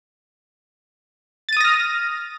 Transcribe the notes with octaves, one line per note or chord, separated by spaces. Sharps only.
D#6 F6 A6 A#6 D#7